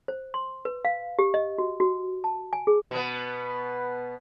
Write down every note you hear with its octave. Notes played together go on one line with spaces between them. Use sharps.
C5
C6
B4
F5
G4
D#5
F#4
F#4
A5
G#5
G#4
B2 B3